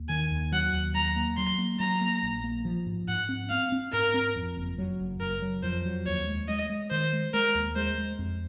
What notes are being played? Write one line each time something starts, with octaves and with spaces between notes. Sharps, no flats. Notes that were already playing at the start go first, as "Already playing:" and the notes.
Already playing: D#2
D#3 G#5
D#2
F#3 F#5
D#2
F#3 A#5
A#3
F#3 C6
A#3
F#3 A#5
A#3
A#1
A#3
F3
G#2
G#2 F#5
C4
C4 F5
C4
G#2 A#4
C4
F2
F#1
F#3
F#1
F#1 A#4
F#3
F2 C5
F#3
D#2 C#5
G#3
G#3 D#5
G#3
D#3 C5
G#3
G#3 A#4
D#2
G#3 C5
G#3
F2